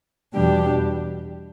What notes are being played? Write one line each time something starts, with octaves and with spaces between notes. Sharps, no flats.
E2 B2 G3 D4 G4